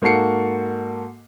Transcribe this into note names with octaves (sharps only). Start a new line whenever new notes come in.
G#2 A#3 F#4 A4 C7 C#7